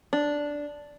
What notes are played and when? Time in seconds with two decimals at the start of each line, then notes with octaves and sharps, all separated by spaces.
0.13 D4